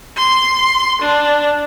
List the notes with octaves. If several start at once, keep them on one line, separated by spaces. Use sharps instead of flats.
C6
D4